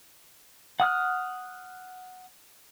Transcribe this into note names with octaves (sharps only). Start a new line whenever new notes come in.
F#5 D#6 F6 F#6